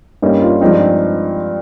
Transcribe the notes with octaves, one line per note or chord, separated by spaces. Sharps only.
G2 G3 A#3 C#4 D#4
F4
G2 F3 G#3 C4 D#4